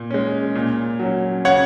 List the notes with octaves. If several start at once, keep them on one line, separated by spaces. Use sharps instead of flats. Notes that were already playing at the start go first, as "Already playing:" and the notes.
Already playing: A#2
G#3 C#4
A#2
F#3 C#4
C#3 C#5 F#5